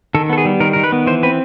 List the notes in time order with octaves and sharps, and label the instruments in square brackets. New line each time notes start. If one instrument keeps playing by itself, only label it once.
[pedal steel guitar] D#3 A4
B3 A4
G#4
G3
D#3 A#4
D#3 A#4
B4
B3
E3 C5
C4 B4